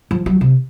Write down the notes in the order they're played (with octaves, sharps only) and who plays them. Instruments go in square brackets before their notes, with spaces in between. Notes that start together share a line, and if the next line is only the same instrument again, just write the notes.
[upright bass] F3
F#3
C3